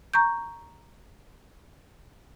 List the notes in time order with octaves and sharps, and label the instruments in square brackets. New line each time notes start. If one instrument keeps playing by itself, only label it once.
[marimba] A#5 C#6 G6